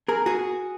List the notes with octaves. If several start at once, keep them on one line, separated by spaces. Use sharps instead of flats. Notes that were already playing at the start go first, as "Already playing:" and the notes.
G#4 A#4
F#4 G#4